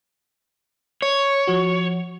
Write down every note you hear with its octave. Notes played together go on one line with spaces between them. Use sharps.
C#5
F3 F#4